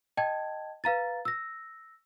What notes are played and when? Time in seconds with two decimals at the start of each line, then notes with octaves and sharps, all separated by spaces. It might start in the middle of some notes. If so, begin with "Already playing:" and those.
0.17 D#5 G5 A5 G#6
0.84 B4 F5 A#5 A6
1.25 E6 A#6